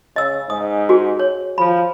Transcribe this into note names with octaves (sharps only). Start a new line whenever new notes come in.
C#3 D#5 E6
G#2 D#6
F#4 G#4
C#5
F3 B5